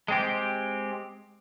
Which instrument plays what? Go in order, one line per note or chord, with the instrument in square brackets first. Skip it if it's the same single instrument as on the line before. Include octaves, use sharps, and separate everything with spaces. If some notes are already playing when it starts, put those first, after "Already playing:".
[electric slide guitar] G#3 C4 G4